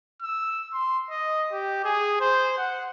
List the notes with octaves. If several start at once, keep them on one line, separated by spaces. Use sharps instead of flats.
E6
C6
D#5
G4
G#4
C5
F#5